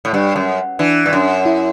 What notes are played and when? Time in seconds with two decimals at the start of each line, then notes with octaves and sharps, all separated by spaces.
0.05 A2
0.13 G2 G3
0.36 F#2
0.79 E3 D4
1.06 G2
1.13 F#2
1.46 E4